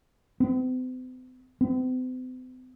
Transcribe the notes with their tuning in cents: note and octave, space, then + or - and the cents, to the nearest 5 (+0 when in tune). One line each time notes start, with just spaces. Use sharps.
C4 -45
C4 -45